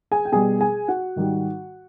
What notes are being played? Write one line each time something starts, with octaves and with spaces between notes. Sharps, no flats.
G#4 G#5
G5
B2 G3 G#4 G#5
G#4 G#5
F#4 F#5
G#2 D#3 G3